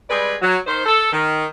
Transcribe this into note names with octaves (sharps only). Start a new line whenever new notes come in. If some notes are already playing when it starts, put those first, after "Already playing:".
G3 G#3 C4 G#4 B4 D5
F#3
D#3 C5
A4
D#3